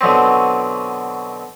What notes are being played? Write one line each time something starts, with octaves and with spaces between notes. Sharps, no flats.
B2 D3 F#3 C4